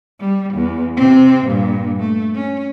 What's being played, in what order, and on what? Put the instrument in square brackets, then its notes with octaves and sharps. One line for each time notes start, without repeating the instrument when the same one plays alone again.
[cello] G3
E2
C3 C4
G2 A#2
A3
C#4